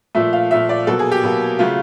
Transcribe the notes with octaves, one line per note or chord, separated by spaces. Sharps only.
A#2 F3 A3 E5
F5
A#2 F3 A3 E5
D5
B2 F#3 A#3 A4
G#4
G4
B2 F#3 A#3
C#3 F#3 A3 F4